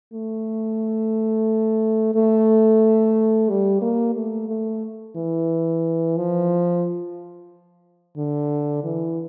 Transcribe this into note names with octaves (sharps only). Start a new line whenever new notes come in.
A3
A3
G3
A#3
A3
A3
E3
F3
D3
E3